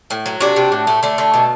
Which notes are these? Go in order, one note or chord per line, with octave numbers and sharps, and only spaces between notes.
A2
F#3
C3 D4 F#4
C3
A2
A3
D3 A3
D3
B2